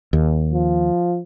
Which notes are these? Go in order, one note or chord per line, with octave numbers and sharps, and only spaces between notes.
D#2
F3